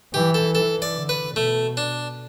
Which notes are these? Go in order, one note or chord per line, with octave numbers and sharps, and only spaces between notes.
E3 G4
A4
E3 A4
D5
D3
B4
B2 A3
D4